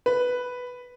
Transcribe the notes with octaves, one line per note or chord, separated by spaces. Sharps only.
B4